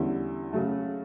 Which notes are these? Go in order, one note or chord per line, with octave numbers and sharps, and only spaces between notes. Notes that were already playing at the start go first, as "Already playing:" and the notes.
Already playing: E2 D3 G3 C#4 E4
C#3 F#3 A3